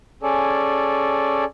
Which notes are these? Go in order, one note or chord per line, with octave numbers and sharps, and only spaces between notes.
C#4 G#4 A4 D5